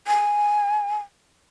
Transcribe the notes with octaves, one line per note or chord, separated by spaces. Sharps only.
G#5